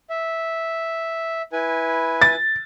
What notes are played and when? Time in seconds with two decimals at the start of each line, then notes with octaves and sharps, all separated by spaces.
0.10 E5
1.52 E4 B4 G#5
2.22 A6